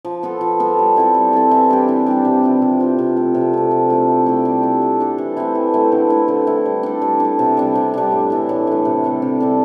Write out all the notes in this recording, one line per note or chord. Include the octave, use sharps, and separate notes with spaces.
F3
B3 F4 A4
F3
B3 F4 A4
G3
C4 E4 A4
G3
C4 E4 A4
E3
G3 D4 G4
E3
G3 D4 G4
C3
F3 C4 G4
C3
F3 C4 G4
C3
F3 A3
C3
F3 A3
F3
A3 E4 G4
F3
A3 E4 G4
G3
D4 A4
G3
D4 A4
E3
A3 C4 E4
E3
A3 C4 E4
D3
A3 E4
D3
A3 E4
G3
D4 A4
G3
D4 A4
C3
G3 D4
C3
G3 D4
A2
E3 A3
A2
E3 A3
C3
G3 D4 A4
C3
G3 D4 A4